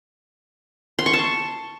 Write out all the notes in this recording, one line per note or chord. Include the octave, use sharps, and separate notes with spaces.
C6
C#6
A5